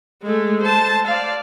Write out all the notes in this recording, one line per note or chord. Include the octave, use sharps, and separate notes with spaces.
G#3 A3
C5 A5
D5 F5